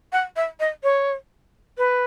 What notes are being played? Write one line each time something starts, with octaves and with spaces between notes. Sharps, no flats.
F#5
E5
D#5
C#5
B4